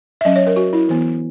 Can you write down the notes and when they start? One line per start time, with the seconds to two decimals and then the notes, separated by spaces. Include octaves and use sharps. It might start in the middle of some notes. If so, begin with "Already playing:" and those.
0.21 E5
0.25 F#3 C#4 D#5
0.36 C#5
0.47 A#4
0.56 F#4
0.73 E4
0.89 E3 B3